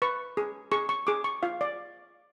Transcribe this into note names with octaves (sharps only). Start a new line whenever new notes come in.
B4 C#6
G#4
G#4 C#6
C#6
G#4 D6
C#6
F4 F5
D5